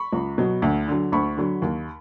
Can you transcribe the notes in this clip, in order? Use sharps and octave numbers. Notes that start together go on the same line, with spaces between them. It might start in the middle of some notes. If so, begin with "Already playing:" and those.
Already playing: B5 C#6
C#2
B2 F#3
D2
D3 F#3
D2 B5 C#6
D3 F#3
D#2